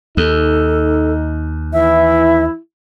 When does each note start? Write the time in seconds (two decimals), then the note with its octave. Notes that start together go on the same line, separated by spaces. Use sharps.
0.17 D#2 D#4 A4
1.73 E3 E4 E5